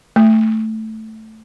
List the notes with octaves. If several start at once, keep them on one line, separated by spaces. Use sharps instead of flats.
A3